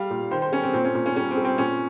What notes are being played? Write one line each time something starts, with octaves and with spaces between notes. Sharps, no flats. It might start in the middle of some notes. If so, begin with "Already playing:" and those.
Already playing: G3 F5
A#2
D#3 C5
C5
G3 C#4
C4
A#2 C4
C#4
A#2
C#4
G3 C#4
C4
G3
C4
A#2 C#4